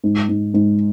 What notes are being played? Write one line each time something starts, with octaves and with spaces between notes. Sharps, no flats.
G#2
G#2
G#2